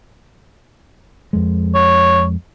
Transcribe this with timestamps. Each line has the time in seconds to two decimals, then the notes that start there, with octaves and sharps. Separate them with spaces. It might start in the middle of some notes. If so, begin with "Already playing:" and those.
1.33 F2 G#3
1.74 C#5